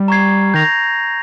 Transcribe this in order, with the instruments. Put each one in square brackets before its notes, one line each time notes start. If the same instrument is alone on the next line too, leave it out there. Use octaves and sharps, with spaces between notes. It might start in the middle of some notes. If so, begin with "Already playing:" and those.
Already playing: [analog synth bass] G3
[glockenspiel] A#5 C#6 G#6 C7
[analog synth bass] D#3 [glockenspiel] G6 A#6 F7